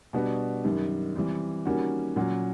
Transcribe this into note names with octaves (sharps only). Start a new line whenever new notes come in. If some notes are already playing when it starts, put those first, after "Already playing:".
B2 G3 B3 D4 F#4
F#2 D#3 G3
E3 G3 C4
D#3 G3 A#3 C#4 F#4
A#2 F#3 A#3 C#4